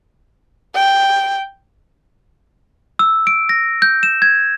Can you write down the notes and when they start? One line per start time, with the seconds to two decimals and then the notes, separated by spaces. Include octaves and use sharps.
0.75 G5
2.99 E6
3.27 D7
3.49 A#6
3.82 G6
4.03 E7
4.22 G#6